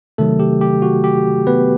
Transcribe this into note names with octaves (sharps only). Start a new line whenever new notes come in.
C3 D#3 F#3 A3 A4
G4
G4
F#4
G4
B3 B4